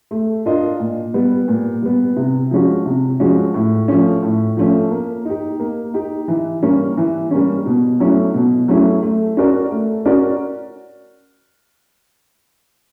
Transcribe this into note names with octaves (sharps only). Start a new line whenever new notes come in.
A3
D4 F4 A#4 D#5
A#2
G3 B3
A#2
G3 B3
C3
F3 G#3 C#4 F#4
C3
F3 G#3 C#4 F#4
A2
F3 A3 C#4
A2
F3 A3 C#4
A#3
D#4 G4
A#3
D#4 G4
E3
G3 A#3 C#4
E3
G3 A#3 C#4
B2
F#3 A3 C#4 E4
B2
F#3 A3 C#4 E4
A3
C#4 F#4 A#4 D5
A3
C#4 F#4 A#4 D5